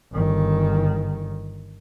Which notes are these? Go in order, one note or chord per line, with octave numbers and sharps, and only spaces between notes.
G1 D#3